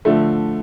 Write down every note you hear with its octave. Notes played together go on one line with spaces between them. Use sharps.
D3 F3 A3